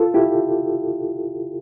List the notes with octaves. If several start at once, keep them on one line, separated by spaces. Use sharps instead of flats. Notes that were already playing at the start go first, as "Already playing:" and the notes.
Already playing: F4 A4
E4 G4